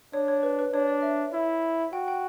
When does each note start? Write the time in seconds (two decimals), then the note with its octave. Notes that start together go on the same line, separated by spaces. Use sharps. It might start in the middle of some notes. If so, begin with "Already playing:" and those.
0.13 D4 C#5
0.28 C#5
0.43 B4
0.59 B4
0.73 D4 C#5
0.88 D5
1.02 E5
1.33 E4
1.93 F#4 G5
2.08 G5